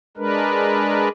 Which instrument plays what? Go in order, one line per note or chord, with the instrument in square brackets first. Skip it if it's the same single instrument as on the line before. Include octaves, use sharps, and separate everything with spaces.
[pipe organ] G#3 D4 A#4 B4